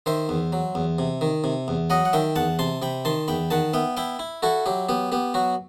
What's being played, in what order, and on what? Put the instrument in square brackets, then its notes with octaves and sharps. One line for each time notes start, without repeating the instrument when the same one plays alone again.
[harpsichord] D#3 C5 E5
E2
F#3
E2
C3
D#3
C3
E2
F#3 D#5 F#5
F#5
D#3 E5 G5
E2 F#5 A5
C3 A5 C6
C3 G5 B5
D#3 A5 C6
E2 G5 B5
D#3 F#5 A5
B3 E5 G5
E4 E5 G5
E4
E4 F#4 A4
F#3 G4
B3 G4
B3 G4
F#3 F#4